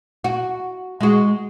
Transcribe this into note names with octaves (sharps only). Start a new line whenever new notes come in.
F#4
G#3 F#4